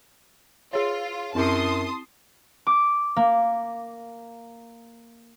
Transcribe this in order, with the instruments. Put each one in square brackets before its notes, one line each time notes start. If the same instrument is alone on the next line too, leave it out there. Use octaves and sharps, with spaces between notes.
[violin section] F4 [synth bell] G#4 C#5
[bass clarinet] F#2 [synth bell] C4 E4 [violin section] A5 C6 D#6
[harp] D6
A#3